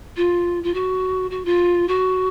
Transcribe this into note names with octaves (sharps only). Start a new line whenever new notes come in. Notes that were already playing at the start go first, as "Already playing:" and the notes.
F4
F4
F#4
F#4
F4
F#4